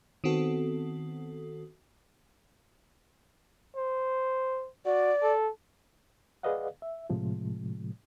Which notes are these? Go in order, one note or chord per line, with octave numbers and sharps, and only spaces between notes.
D#3 B3 C4 F#4 A4
C5
F#4 D5
A4
G#4 B4 D5 D#5 F5 F#5
E5
A2 C3 F3 G#3